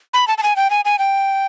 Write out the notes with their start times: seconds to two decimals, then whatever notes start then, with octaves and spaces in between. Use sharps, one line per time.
0.14 B5
0.28 A5
0.38 A5
0.43 G#5
0.56 G5
0.70 G#5
0.85 G#5
0.99 G5